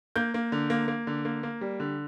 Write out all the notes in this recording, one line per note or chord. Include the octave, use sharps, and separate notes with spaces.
A#3 G6
A#3
D3
A#3
A#3
D3
A#3
A#3
G3
D3